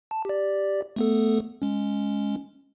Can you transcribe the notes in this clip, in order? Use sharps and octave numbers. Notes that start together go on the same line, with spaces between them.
A5
G4 D5
A3 B3 A4
G#3 C#4